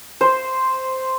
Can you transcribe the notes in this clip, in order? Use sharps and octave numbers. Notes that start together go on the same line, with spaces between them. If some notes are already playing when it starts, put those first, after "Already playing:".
C5